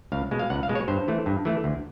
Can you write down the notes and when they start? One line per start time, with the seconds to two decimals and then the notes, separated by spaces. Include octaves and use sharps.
0.12 C#2 F5
0.31 B2 G#3
0.39 F5
0.50 C#2 F#5
0.63 F5
0.69 B2 G#3
0.75 C#5
0.88 G2 C5
1.08 E3 A3
1.26 G2
1.45 E3 A3
1.64 D2